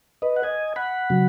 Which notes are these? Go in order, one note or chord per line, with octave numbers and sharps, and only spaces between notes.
B4 D#5
F#5
D#5 G#5
F#5 B5
C#3 F#3